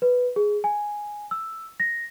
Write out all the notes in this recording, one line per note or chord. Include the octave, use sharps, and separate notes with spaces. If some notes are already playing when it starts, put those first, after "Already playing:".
B4
G#4
G#5
E6
A#6